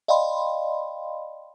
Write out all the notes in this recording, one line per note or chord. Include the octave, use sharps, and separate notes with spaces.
D5 D#5 F5 G5 B5 C6